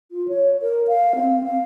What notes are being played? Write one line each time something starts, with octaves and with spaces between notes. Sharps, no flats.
F4
C#5
A#4
F5
C4
F5